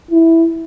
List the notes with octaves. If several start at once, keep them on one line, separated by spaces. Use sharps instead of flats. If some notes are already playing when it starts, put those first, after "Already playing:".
E4